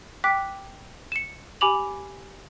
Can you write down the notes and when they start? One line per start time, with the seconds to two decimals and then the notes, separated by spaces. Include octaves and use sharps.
0.24 G5 D6 F#6 B6
1.12 C#7 E7
1.61 G4 G#5 B5 D6 F7 F#7